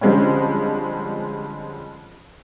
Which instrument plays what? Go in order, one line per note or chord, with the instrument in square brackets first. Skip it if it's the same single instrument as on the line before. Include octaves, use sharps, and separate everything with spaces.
[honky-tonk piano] D3 F3 G3 G#3 C4 C#4